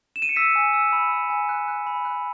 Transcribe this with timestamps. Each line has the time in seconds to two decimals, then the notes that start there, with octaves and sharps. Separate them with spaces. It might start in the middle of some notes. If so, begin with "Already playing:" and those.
0.16 E7
0.22 D#7
0.29 C#7
0.36 E6 B6
0.56 G#5
0.73 E6
0.93 B5
1.11 E6
1.30 G#5
1.49 F#6
1.68 F#6
1.87 B5
2.05 F#6